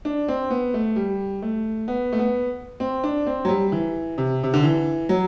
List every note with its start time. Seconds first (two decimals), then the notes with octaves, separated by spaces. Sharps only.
0.05 D4
0.28 C4
0.50 B3
0.74 A3
0.96 G3
1.42 A3
1.88 B3
2.13 A3
2.19 B3
2.80 C4
3.04 D4
3.27 C4
3.45 F#3
3.49 G3
3.72 E3
4.18 C3
4.43 C3
4.54 D3
4.64 E3
5.09 F#3